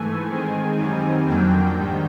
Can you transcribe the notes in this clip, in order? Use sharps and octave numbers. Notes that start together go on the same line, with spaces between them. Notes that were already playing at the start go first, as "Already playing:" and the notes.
Already playing: G#2 E3 A3 G#5
D#3 G#3 C4
F#2 D#3 G3 C4 D#4
F2 D3 F#3 A#3 D4 G5
G#2 D#3 G3